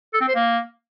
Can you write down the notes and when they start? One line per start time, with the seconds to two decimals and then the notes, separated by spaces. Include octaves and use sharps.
0.14 A4
0.21 C4
0.28 C5
0.35 A#3